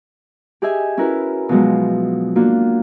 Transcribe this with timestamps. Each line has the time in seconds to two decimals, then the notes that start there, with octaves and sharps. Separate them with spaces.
0.62 G4 G#4 D#5 E5 G#5
0.97 C#4 E4 F#4 A#4 B4
1.49 B2 F3 F#3 G#3
2.36 A#3 D4 F4 F#4